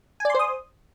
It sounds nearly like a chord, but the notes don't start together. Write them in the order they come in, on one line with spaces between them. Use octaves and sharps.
G#5 D5 C6 C5 D#6